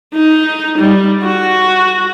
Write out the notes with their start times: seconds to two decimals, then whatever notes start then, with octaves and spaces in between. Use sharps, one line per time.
0.15 D#4
0.79 G3
1.24 F#4